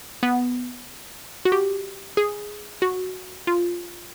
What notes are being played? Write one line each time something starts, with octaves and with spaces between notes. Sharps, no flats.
B3
F#4
G4
G#4
F#4
F4